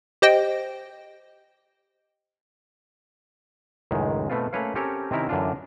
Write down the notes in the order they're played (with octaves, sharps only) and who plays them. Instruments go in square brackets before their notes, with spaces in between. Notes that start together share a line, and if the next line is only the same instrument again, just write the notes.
[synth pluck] G4 C5 D#5 G5
[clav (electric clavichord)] C#2 F#2 A2 D#3 G#3
B2 A3 B3 C4 F4
A3 A#3 C#4 B4 C#5 F5
C4 C#4 G4 A4 A#4 C#5
C3 D#3 C4 C#4 E4 A#4
F#2 D3 E3 F#3 D4 F4